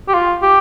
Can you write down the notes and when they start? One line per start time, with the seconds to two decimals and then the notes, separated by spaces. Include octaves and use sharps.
0.09 G4
0.14 F4
0.43 G4